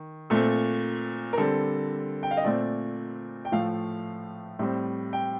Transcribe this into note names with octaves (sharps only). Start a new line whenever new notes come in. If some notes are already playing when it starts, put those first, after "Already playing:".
Already playing: D#3
A#2 A3 C4 A4
A#4
D3 G3 C4 A4
G5
F5
D#5
A#2 A3 C4 D5
G5
A2 F3 A3 F5
A2 G3 C4
G5